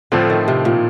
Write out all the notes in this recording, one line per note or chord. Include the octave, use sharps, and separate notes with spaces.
A2 D3 F3 A3 C4 F4
D#3
C3
A#2